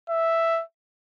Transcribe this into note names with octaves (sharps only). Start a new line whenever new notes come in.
E5